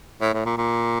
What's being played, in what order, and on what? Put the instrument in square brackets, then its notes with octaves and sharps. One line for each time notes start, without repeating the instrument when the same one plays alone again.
[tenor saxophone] A2
A2
A#2
A#2